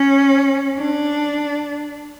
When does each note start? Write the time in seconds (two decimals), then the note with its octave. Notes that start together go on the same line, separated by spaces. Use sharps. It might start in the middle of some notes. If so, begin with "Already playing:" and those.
Already playing: C#4
0.78 D4